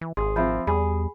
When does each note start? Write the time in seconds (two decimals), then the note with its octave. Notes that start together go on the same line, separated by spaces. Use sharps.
0.01 E3
0.17 G#1 G#4 C6
0.36 F3 C4 E5 B5 G6
0.67 E2 G3 G#4 G#5 B5